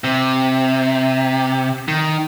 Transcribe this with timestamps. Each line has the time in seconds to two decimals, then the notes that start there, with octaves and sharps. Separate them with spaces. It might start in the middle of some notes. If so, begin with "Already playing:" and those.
0.04 C3
1.88 D#3